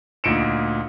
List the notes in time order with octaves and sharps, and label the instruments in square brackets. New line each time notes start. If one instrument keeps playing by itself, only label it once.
[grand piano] D2 A#2 D#4 C#7 D7 E7